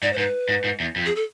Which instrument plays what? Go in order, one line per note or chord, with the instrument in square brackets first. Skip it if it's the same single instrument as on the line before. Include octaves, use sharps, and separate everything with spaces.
[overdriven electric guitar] G#2 [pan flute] D5
[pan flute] C5
[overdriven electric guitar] G#2 [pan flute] B4
[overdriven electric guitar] G#2
G#2
E2
F2
[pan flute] G#4
A4